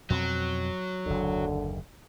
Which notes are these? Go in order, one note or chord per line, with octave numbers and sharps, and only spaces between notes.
F2 B2 F#3 C4
F#1 D#2 D3